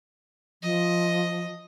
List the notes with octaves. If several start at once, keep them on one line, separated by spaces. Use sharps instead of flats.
F3 D#5